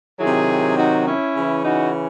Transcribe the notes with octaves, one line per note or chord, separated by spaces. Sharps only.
C3 D#3 F#3 E4 G#4
D#4 F#4
C#4 E4
C#3 E3
D#4 F#4